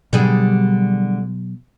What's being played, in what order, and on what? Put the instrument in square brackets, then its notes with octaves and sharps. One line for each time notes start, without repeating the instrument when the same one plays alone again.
[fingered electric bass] B2 F#3 [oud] D3 G3 G#4